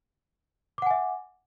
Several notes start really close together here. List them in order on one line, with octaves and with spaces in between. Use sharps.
D6 F#5 G#5 E5